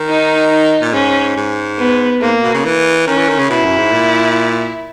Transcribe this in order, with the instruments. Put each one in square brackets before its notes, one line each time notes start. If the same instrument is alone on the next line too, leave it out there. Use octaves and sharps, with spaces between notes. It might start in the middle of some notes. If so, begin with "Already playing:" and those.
Already playing: [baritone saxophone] D#3
[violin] D#4
D#4
[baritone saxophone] A#2
[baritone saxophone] G#2 [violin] C#4
[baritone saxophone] G#2
[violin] B3
[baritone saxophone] G#2 [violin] A#3
[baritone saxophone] B2
C#3
E3
[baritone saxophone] D#3 [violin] C#4
[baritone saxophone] E3
D#3
C#3
[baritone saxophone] B2 [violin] E4
[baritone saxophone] F#2
G#2
A#2